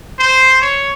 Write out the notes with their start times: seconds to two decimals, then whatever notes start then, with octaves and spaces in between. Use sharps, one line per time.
0.19 C5
0.62 C#5